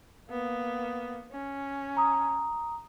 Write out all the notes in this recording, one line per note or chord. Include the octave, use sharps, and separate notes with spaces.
A#3 B3
C#4
A#5 D#6